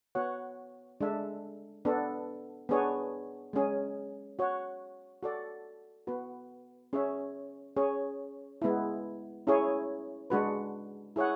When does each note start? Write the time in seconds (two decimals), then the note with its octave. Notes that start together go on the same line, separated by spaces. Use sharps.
0.15 B3 F#4 C#5 F#5
1.01 G#3 D4 A4 E5
1.85 B3 D4 A4
2.69 B3 D4 G#4 C#5
3.53 G#3 C#4 G#4
4.39 F#4 C#5 F#5
5.23 F#4 A4 D5
6.07 B3 F#4 B4
6.93 C#4 G#4 C#5 E5
7.76 C#4 G#4 C#5
8.62 G#3 B3 E4
9.47 C#4 E4 G#4 C#5
10.30 G#3 D4 F#4 B4
11.16 E4 G#4 C#5 F#5